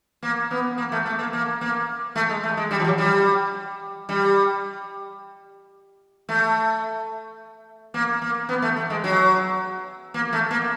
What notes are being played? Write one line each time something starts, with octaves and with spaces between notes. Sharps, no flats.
A#3
B3
A#3
A3
A3
A#3
A#3
A#3
A3
G#3
A3
G#3
G3
F3
F#3
G3
G3
A3
A#3
A#3
B3
A3
A3
G#3
F#3
A#3
A3
A#3